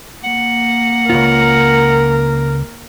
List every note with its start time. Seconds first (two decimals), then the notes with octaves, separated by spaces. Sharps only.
0.24 A#3 F#5
1.10 C#2 G#2 F4 A#4